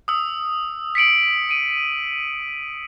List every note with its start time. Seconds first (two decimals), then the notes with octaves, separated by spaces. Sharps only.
0.08 D#6 E6
0.95 B6 C#7 D7 F#7
1.49 D7 D#7